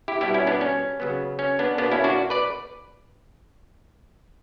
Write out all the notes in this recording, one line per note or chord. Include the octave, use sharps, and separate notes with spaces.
E4 G4
B2 G3 B3 E4 G4
C#4 E4
B3 D4
C#4
C#3 F#3 B3
C#4
B3 D4
B2 A#3 B3 D4
C#4 E4
D4 F#4
B4 D5